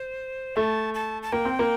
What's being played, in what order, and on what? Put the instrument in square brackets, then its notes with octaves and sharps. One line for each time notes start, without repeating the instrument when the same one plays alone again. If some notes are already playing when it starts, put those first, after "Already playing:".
Already playing: [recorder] C5
[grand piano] A3 [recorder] A5
[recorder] A5
A5
[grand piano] A#3 [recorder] G5
[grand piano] C4
A#3